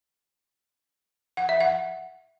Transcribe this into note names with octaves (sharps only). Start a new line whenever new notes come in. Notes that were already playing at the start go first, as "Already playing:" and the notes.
F#5
E5
F#5